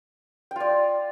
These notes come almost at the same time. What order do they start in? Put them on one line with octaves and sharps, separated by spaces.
G5 F4 D5